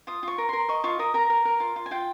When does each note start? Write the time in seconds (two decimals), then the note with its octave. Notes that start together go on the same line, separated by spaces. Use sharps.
0.07 F4 D#6
0.23 F4 C#6
0.38 A#4
0.49 A#4 C6
0.69 D#5 C#6
0.84 F4 C#6
0.99 A#4 D#6
1.14 A#4 A#5
1.30 A#4
1.45 A#4
1.60 F4
1.76 F4
1.86 G#5
1.91 F4 G5